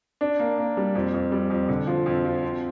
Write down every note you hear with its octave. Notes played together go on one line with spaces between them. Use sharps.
D4
A#3
A#3
G3
F2
F2
G3
F2
D3
F3
F2
F3
C4